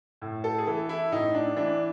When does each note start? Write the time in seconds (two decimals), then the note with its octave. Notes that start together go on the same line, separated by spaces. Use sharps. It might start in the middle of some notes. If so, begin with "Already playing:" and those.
0.22 A2
0.44 A4
0.58 G#4
0.67 E3 A4
0.89 E4
1.12 A2 D#4
1.34 D4
1.56 E3 D4